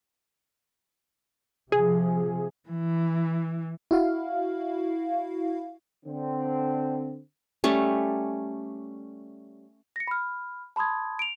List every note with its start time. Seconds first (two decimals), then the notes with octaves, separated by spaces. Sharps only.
1.72 C3 F3 G#4
2.69 E3
3.91 E4 F#4 F5
6.05 D3 C4
7.64 G3 A3 C#4
9.96 A#6 C#7
10.07 B5 F6
10.76 A5 B5 C6 D#6 G#6
11.19 D7 F7